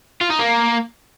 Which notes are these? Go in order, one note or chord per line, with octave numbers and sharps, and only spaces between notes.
F4
D#4
A#3